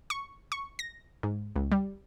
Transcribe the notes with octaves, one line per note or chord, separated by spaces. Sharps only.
C#6
C#6
A#6
G#2
C#2
G3